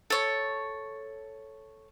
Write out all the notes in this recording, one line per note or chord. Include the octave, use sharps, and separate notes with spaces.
A4 C#5